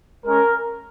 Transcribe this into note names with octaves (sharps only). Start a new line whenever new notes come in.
G#3 C#4 A#4